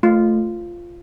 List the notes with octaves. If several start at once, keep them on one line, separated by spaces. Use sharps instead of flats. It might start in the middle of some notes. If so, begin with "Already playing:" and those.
A3 F4